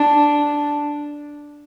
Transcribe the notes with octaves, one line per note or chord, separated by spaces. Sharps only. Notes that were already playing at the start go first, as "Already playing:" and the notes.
Already playing: D4